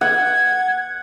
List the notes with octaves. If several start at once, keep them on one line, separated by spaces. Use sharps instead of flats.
F#5 G#6